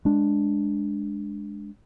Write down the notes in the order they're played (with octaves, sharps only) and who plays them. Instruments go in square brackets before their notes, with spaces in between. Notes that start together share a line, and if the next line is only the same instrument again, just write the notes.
[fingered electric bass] G#3 D4